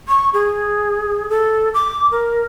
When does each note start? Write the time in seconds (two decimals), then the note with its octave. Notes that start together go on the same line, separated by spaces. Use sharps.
0.08 C#6
0.34 G#4
1.29 A4
1.74 D6
2.12 A#4